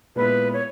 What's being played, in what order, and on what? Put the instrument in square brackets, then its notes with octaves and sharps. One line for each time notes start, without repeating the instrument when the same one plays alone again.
[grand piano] A#2 G#3 B3 E4 [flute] B4
[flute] C#5